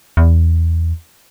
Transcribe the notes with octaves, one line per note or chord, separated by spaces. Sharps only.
E2